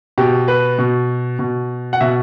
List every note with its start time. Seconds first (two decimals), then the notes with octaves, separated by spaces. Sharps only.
0.18 B2 G4
0.48 B4
0.79 B2
1.39 B2
1.93 F#5
2.01 B2 E5